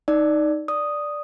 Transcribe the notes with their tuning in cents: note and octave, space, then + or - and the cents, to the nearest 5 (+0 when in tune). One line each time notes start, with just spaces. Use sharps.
D#4 +0 D5 +0
D5 +0 D#6 +0